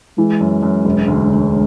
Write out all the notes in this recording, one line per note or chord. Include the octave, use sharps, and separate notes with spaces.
E3 G#3
F#2
F#2
E1
D2
D2